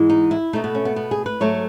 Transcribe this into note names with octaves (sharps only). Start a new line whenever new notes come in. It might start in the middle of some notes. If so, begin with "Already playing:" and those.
Already playing: G#2 E3 G#3
D#4
E4
B2 A3 D#4
B3
C#4
B3
B3
G#4
B4
G#2 F#3 A3 C#5